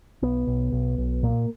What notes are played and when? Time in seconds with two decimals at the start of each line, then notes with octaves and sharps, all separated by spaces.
0.22 B1 B3
0.47 B1
0.72 B1
0.98 B1
1.23 A#2 A#3